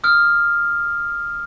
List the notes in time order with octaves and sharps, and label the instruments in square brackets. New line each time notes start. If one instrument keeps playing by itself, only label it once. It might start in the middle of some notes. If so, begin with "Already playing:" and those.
[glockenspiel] D#6 F6